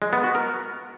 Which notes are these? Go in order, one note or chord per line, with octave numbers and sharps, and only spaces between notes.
G#3
B3
F#4
A#4